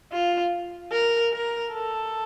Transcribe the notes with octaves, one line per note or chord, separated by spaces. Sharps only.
F4
A#4
A#4
A4